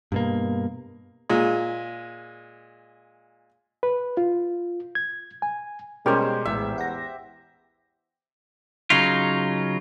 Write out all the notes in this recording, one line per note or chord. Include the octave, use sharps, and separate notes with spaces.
G2 B2 A#3
A#2 G#3
B4
F4
G#6
G#5
B2 G3 G#3 C#4 G4 A#4 C5
A#1 E2 A2 G#3 E5
F#5 A#6
C#3 F#3 D#4 F4